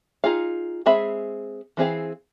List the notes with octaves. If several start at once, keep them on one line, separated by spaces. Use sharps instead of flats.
D#4 F4 G#4 F5
G#3 C4 G#4 E5 B5
E3 C4 G#4 F5